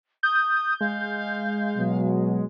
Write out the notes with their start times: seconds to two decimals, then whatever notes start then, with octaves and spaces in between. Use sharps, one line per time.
0.23 D#6 G6
0.81 G#3 F5
1.77 B2 F#3